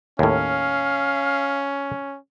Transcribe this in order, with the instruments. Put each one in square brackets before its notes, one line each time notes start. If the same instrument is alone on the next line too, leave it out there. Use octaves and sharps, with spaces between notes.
[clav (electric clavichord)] D#2 A2 [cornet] C#4 [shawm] F5